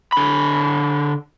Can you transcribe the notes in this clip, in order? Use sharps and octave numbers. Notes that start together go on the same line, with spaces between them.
D3 B5